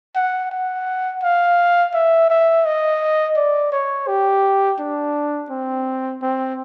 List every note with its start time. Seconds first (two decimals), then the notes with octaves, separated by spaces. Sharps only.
0.15 F#5
0.51 F#5
1.23 F5
1.94 E5
2.30 E5
2.65 D#5
3.36 D5
3.72 C#5
4.08 G4
4.79 D4
5.50 C4
6.22 C4